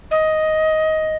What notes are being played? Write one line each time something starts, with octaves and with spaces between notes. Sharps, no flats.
D#5